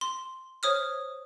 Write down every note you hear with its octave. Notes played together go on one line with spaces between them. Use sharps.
C6
C5 C#5 D#6 F6